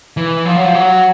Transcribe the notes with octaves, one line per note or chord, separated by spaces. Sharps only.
E3
F3
F#3
F3
F#3